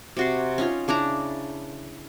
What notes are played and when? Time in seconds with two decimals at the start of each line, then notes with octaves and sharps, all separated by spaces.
0.17 C3 F#4 C6
0.58 C#4 D#4 F4
0.88 C#3 D4 E4 A#5